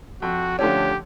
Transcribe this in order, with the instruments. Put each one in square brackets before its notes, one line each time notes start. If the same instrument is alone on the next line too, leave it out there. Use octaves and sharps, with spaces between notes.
[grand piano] F2 [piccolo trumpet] F#4
[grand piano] D3 F3 A3 C#4 [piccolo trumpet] G4